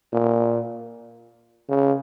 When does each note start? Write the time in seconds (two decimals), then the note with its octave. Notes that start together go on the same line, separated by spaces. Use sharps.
0.13 A#2
1.69 C#3